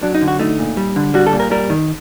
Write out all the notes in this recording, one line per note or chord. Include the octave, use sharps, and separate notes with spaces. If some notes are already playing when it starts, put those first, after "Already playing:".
F#3 D4
D#4
D3
F#4
A3 D#4
A#2
G3
D3
G3 F#4
A4
A#2
A#4
G3 A#4
D#3